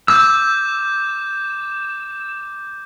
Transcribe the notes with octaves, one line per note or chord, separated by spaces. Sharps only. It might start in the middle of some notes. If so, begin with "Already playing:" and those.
D6 E6 G6